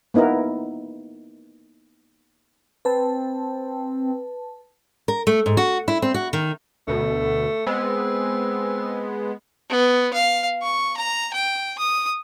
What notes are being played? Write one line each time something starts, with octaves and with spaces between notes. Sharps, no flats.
A#3 B3 D#4 E4 A#4
C4 B4 A5
A#4
A3
G#2
F#4
E4
C4
F#4
D#3
D2 B2 A3
G#3 B3 C4
B3
F5
C#6
A#5
G5
D#6